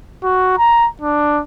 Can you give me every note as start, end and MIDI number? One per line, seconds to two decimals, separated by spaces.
0.24 0.58 66
0.59 0.87 82
1.02 1.41 62